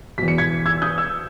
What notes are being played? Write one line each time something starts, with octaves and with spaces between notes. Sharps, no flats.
E2 B2 B6
C#7
G#6 B6
E6 G#6
D#6 G6
E6 G#6